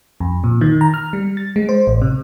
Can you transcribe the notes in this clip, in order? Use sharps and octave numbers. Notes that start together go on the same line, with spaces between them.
F2
A#2
D#3
A#5
F6
G3
A6
G#3
C5
A1
C3